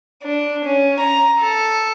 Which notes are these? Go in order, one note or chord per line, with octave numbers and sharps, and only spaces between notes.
D4
C#4
A#5
A4